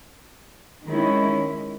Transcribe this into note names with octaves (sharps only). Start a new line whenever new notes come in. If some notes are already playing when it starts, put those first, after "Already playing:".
D#3 G#3 C#4 E4